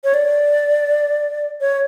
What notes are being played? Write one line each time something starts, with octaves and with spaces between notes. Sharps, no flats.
C#5
D5
C#5